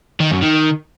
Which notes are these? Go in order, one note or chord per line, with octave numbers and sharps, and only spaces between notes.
D#3
F#2
D#3